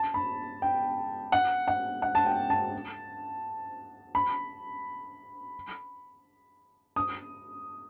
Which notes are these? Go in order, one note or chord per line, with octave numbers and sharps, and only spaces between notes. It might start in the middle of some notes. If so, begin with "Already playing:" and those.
Already playing: A5
B5
G5
F#5
F#5
F#5
A5
G5
A5
B5
D#6